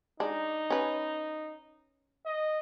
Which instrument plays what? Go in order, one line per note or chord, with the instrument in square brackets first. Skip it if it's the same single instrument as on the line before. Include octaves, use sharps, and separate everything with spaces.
[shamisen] G#3 D4 [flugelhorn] D#4
[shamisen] C#4 B4
[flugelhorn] D#5